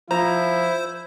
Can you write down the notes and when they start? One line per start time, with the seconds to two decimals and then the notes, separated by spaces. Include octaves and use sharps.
0.11 F3 E4 C5 A#5